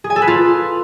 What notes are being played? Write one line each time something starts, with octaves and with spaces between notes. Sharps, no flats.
G#4
G#5
A4
B4
F4